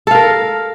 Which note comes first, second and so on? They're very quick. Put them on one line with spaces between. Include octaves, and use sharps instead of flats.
A4 F5 A#4